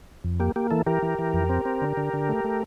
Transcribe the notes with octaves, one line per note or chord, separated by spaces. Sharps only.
F2
A#3 G4
A#3 G4
E3 A4
E3 G4 A#4
E3
E3
F2
C4
C4
D3
D3
D3
A3
A3